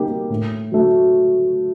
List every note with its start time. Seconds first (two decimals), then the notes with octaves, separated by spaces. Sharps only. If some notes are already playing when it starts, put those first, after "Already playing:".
Already playing: G3 A#3 D#4 G4
0.30 A2
0.72 F#3 A3